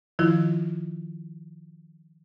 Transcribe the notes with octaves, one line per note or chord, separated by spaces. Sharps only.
D#3 F3 E4 F4